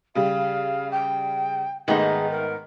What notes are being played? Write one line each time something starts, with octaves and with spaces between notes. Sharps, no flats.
C#3 G3 F5
G5
G#2 D#3 A3 B3 D#4 G#4
A#4